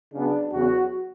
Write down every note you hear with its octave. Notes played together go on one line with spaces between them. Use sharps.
C#3 F#3 B3 D4
E2 C#3 F#3 B3 F#4